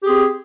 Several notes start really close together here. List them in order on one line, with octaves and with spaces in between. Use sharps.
G4 G#4 C4